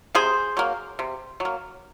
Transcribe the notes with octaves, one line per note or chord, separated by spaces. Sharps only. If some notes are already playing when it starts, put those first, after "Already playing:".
C3 G#4 C5
F#3 A#3
C3
F#3
A#3